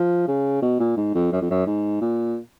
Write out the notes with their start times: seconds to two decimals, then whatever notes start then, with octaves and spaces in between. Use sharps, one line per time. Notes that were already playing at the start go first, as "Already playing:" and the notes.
Already playing: F3
0.28 C#3
0.62 B2
0.80 A#2
0.97 G#2
1.14 F2
1.32 F#2
1.41 F2
1.50 F#2
1.66 G#2
2.01 A#2